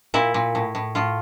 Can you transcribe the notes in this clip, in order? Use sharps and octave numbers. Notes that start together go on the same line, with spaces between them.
A#2 E4
A#2
A2
A2
A2 F4